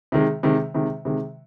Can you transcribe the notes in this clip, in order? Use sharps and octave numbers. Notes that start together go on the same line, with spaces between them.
C3 D#3 G#3
C3 D#3 G#3
C3 D#3 G#3
C3 D#3 G#3